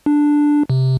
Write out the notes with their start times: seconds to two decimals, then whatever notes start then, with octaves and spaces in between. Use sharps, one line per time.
0.06 D4
0.70 C3